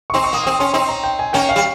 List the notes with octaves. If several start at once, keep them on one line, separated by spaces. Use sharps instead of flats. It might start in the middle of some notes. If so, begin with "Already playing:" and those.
C#6
C4 D#4 C6
C#6
A#3 D#6
C4 D#6
C#4 C6
C4 D#4 C6
A#5
G5
G#5
A#3 C#4 G5
F5
G3